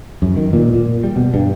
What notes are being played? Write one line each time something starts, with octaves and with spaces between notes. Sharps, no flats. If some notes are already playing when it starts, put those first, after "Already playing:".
F#2
D#3
A#2
A#2
G3
B2
G2